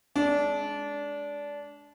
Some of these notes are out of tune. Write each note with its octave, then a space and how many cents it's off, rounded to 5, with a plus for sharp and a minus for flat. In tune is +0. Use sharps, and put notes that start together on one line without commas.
G#3 +20 D4 -20